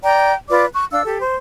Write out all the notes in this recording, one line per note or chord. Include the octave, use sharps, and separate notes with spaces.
D5 G5 A#5
F4 B4 D5 D6
C#6 F#6
D4 F5 E6
G4 A4
C5